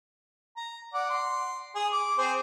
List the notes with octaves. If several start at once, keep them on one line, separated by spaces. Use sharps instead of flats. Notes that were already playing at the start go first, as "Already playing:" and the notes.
A#5
D5 F#5
C6
G#4
D6
C4 G#4 C5